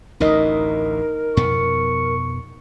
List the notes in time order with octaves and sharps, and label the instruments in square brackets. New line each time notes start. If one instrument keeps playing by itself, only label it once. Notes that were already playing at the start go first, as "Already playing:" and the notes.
[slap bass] A1 D2 A2 [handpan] D#4 D#5 [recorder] A#4
[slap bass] F2 B2 B3 [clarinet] C#6